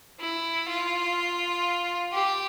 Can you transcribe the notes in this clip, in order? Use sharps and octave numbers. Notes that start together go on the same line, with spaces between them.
E4
F4
G4